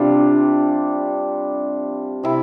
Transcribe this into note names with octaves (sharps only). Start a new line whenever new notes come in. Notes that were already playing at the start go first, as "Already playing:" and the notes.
Already playing: C3 G3 D4 F4
C3 E4